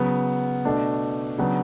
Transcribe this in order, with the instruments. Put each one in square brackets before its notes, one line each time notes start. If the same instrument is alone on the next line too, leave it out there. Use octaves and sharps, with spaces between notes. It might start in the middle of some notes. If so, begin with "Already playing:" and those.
Already playing: [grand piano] C#3 F#3 B3
B2 A3 D4
C#3 F#3 B3 D4